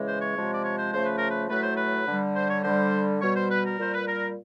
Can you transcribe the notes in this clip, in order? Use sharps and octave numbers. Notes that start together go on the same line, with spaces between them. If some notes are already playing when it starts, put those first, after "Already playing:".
Already playing: C#3 E3 G#3
C5
C#5
C3 F3 G#3
D5
C#5
C5
C#3 F3 A3 C5
B4
A#4
B4
A2 F#3 A3 B4
C5
B4
D3 G3
C5
C#5
D3 G3 C5
B2 G3 C#5
C5
B4
A#4
A#2 G3 C5
B4
A#4